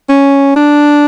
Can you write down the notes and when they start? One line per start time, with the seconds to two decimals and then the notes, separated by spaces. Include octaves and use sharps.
0.09 C#4
0.56 D4